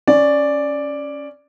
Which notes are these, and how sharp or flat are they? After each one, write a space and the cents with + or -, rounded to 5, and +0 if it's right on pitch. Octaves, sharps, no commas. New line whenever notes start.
C#4 +0 D5 +0